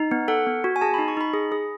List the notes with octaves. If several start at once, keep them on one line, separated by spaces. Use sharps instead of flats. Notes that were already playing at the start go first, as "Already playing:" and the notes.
Already playing: D#4
B3
A4 F#5
B3
F#4
G#5
G#4 A5
B5
D#4
C#6
D#4 B5
G#4
G#4